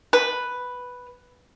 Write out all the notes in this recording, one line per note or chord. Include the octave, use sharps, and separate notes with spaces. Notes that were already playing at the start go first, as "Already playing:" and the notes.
B4